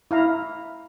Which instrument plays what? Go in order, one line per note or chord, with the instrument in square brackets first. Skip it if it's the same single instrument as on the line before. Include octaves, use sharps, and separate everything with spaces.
[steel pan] E4 F5 A#5